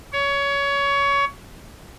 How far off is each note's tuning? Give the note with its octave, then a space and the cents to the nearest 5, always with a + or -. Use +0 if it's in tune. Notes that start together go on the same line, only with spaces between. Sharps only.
C#5 +20